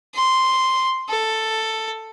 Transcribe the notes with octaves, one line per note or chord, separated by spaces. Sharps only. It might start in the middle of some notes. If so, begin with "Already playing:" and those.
C6
A4